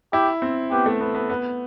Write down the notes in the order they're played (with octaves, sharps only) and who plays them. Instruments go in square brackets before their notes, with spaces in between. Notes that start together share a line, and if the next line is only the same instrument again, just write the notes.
[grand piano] E4 [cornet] G4
[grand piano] C4
[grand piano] B3 [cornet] G4
[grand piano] A3
B3
B3
[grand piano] B3 [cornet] B4